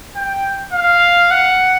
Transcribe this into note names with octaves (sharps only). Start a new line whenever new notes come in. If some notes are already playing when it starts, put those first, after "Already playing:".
G5
F5
F#5